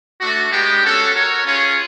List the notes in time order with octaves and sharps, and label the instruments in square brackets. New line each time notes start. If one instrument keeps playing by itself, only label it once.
[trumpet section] A3 D4 F#4
G#3 B3 D4 G4
C#4 F#4 A4 C#5 F#5
F#4 A#4 C#5
C#4 F4 G#4 C#5